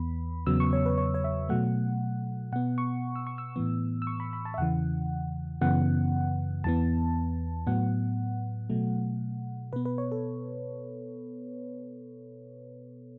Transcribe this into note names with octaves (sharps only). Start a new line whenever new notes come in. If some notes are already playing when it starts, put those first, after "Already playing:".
Already playing: E2 E3 B3 B5
E2 C#3 F#3 B3 E6
C#6
C#5
B4
C#5
C#5
E5
B2 F#3 A3 F#5
B2 B3 F#5
C#6
E6
C#6
E6
A2 E3 B3
E6
C#6
B5
B5
A5
E5
E2 C#3 E3 F#5
F#2 C#3 E3 B3 F#5
E2 E3 B3 A5
A2 F#3 B3 F#5
B2 F#3 A3
B2 B3 B4
B4
C#5
A4